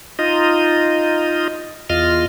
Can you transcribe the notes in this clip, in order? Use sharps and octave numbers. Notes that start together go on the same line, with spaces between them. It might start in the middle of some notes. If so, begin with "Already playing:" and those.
D#4 F4 D#5
E2 F4 D#5 F6